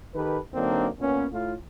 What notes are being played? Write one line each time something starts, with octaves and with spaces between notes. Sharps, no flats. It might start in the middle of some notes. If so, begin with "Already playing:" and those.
D#3 G4 A4 B4
D3 F#3 A#3 C4 D4 D#4
A#2 B3 C#4
A2 F4